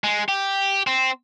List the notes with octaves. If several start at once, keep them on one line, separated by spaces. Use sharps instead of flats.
G#3
G4
C4